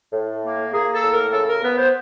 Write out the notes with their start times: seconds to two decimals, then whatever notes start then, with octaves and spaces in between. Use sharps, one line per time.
0.13 A2
0.44 A#3
0.73 A#3 G#4
0.93 A4
1.03 A2
1.13 A#4
1.33 C#3 A4
1.49 A#4
1.63 B3 B4
1.78 C5